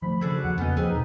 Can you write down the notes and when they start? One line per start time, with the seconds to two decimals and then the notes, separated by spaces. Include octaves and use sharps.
0.02 D#3 F3 F#3 A3 B5
0.21 C#3 D4 F#4 G#4 A4
0.44 D#2 F3 A#3 F#5
0.58 F2 C#3 A#3 B3 C#4 D#4
0.76 D#2 F3 C4 G#4 B4 D#5
0.89 B2 D#4